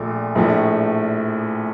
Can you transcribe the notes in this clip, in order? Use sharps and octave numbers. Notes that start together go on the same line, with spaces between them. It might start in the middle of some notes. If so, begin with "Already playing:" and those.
Already playing: A#1 A#2 A3
A#1 A2 F3 A3